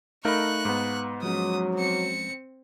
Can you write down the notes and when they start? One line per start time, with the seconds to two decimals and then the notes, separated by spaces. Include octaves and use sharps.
0.25 A3 D#4 A#4 F5 A#5 B5 C#6 F#6
0.65 G#2 B3
1.23 F3 F#3 G#3 C#4 D#6
1.75 C4 C#7